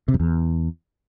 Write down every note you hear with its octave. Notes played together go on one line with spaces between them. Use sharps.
C3
F#2
E2